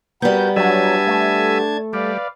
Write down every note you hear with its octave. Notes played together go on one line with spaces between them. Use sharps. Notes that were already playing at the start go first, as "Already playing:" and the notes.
G3 B3 F#4 A#4 B4 G6
F#3 D4 E5 G#5 A5 G#6
A3
G3 B4 D5 F5